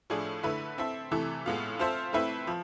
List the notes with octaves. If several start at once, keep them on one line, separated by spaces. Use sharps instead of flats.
A2 F3 A3 D4 G#4
D3 A3 E4 B4 E5
C4 E4 A4 E5
C3 E3 A3 E4 A4
A2 G#3 B3 F4
C4 F4 A4 C5 E5
A3 C4 E4 B4 E5
F3